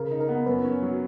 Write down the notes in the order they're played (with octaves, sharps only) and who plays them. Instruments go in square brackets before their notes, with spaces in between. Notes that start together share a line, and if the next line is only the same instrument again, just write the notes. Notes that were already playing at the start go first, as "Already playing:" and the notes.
Already playing: [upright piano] C#3 [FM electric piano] A#4
[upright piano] D#4
[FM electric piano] A#4
[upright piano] B3
[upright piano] F#2 [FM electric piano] B4
[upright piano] C#4
F#3